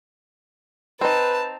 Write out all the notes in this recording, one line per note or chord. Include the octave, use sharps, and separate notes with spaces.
C4 D#4 B4 A5